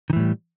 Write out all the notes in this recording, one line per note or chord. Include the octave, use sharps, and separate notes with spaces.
A2 D#3 E3 G3